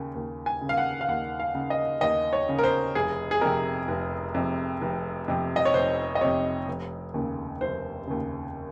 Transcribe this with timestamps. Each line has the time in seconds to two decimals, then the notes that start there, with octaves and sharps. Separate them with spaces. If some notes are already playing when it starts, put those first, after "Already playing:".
Already playing: D#2 C#3
0.15 D#2
0.46 G#5
0.61 C#3
0.69 F5
0.78 F#5
1.01 F5
1.08 D#2 F#5
1.40 F5
1.55 C#3
1.70 D#5
2.01 D#2 D#5
2.33 C#5
2.49 C#3
2.59 A#4
2.63 C5
2.95 F1 G#4
3.31 G#4
3.41 F2 C3 A#4
3.88 F1
4.34 F2 C3
4.81 F1
5.28 F2 C3
5.56 D#5
5.65 C#5
5.74 F1 C5
6.15 D#5
6.21 F2 C3 C#5
6.68 F1
7.14 D#2 C#3
7.61 F1 C5
8.07 D#2 C#3